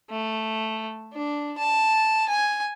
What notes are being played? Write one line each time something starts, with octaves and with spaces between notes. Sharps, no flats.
A3
D4
A5
G#5